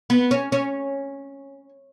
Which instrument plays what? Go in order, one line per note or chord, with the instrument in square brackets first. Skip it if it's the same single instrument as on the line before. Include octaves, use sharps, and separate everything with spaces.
[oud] B3
C#4
C#4